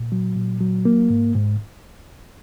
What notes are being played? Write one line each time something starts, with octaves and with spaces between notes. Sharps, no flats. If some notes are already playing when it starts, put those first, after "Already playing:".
Already playing: A#2
F#3
A#2
F#3
A#3
G#2
G#2